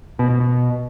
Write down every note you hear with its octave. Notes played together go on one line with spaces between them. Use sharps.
B2
B2
B2